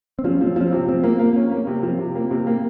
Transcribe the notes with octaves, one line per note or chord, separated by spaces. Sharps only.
C4
F3 C#4
F3
C4
F3 C#4
C3 C4
F3 C4
A#3
A#3
C#4
A#3
C3
F3
C3
A#3
C3
A#3